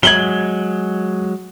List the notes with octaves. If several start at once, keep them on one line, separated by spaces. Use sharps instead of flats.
F#3 G#3 G#6 F#7 G7